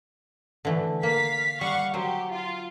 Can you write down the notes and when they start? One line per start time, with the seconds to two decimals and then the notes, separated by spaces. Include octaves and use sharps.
0.65 D3 E3 A3
1.03 A#3 F5 B6
1.61 G3 F5 F#5 C#6
1.94 F#3 G4 C5
2.33 F4